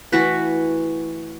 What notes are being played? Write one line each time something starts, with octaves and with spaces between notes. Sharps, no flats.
E3 A3 F#4 B4